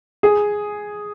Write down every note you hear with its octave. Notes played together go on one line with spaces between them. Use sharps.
G#4